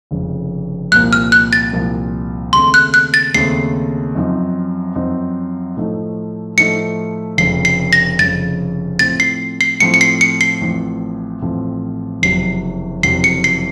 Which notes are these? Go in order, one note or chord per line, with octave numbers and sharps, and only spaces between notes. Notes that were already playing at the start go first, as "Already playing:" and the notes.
F1 F2 C#3
C2 A#2 F3 A#3 F#6
F6
F#6
A6
C2 A#2 F3 A#3
D#2 C#3 A3 C4 C6
F#6
F#6
A6
D#2 C#3 A3 C4 C7
F#2 F3 C4 D#4
F#2 F3 C4 D#4
A2 F3 A3 D#4
A2 F3 A3 D#4 C#7
F1 F2 C#3 C7
C7
A#6
F1 F2 C#3 A6
A2 F3 C4 A6
C7
C7
A2 F3 C4 C#7
C#7
C7
C#7
C7
A1 A2 F3 C4
A1 A2 F3 C4
F#1 F2 C3 F#3 C7
F#1 F2 C3 F#3 C7
C#7
C7